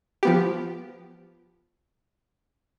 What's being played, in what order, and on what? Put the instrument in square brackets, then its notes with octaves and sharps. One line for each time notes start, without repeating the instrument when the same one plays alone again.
[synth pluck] F3 B3 G4